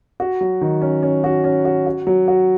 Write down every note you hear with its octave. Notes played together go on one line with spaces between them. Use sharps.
F#4
F#3
D#3
C#4
C#4
F#4
C#4
F#4
F#4
F#3
F#4